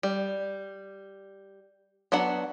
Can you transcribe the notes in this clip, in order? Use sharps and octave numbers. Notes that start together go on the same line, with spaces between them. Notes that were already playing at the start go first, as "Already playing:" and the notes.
G3
F#3 B3 D4 F#5